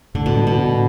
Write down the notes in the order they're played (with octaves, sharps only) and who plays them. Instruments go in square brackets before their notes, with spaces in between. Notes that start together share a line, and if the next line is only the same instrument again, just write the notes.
[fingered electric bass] A2 [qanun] D3
[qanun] B2
[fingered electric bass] G3 B3 D4
[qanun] B2
[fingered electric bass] A2